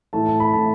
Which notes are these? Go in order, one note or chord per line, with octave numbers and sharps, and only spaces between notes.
A2 E3 A3 A5
A5
B5
A2 E3 A3 A5